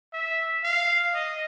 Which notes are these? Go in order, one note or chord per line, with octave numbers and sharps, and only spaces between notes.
E5
F5
D#5